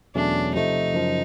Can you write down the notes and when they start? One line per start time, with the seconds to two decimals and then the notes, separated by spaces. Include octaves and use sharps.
0.15 E2 B2 F#3 A3 C#4 D4
0.54 C3 F3 A3 D#4
0.94 F#2 C#3 F3